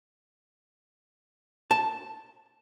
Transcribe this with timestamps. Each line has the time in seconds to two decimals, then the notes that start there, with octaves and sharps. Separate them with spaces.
1.71 A5